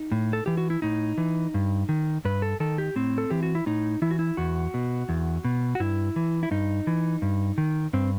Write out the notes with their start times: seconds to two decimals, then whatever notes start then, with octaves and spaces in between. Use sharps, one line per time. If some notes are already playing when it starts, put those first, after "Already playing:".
Already playing: D#4
0.12 A2
0.33 A4
0.46 E3 G4
0.58 F#4
0.70 E4
0.82 A2 D#4
1.18 E3
1.54 G2
1.89 D#3
2.25 G2 B4
2.42 A4
2.60 D#3 A4
2.78 G4
2.96 A2 C4
3.18 A4
3.30 E3 G4
3.43 F#4
3.55 E4
3.66 A2 D#4
4.02 E3 E4
4.11 F#4
4.19 E4
4.37 E2 F#4
4.74 B2
5.09 E2
5.44 B2
5.75 F#4
5.80 G2 E4
6.16 E3
6.43 E4
6.51 G2 D#4
6.87 E3
7.22 G2
7.58 D#3
7.93 G2 C4